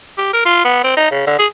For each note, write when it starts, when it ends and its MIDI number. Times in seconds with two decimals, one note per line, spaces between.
0.18 0.29 67
0.33 0.43 70
0.45 0.61 65
0.65 0.82 59
0.84 0.95 60
0.97 1.09 63
1.11 1.24 49
1.27 1.36 50
1.38 1.46 68